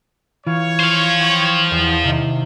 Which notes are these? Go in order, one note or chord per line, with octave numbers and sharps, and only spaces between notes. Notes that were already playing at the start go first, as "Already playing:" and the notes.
E3 F4 C#5
C5 F5
G5
E2
C3 D#3